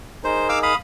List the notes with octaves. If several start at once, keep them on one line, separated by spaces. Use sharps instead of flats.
D#4 G#4 A#4 C5
F5 D6 E6
F5 B5 D#6